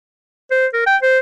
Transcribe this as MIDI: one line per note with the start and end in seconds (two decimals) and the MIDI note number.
0.51 0.67 72
0.73 0.83 70
0.86 0.96 79
1.02 1.19 72